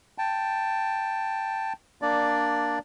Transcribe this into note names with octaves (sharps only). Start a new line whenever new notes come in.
G5 A5
A#3 D4 D5